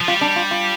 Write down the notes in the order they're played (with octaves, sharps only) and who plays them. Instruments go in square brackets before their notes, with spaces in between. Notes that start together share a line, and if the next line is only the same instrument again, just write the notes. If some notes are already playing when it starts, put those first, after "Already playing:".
[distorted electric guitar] F3
[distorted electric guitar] G3 [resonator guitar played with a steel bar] F4
[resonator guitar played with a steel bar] D4
F4
F4